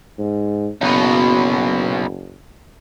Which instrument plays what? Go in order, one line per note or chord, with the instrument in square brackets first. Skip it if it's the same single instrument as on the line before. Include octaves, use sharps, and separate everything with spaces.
[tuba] G#2
[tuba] F#1 [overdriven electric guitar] B1 B2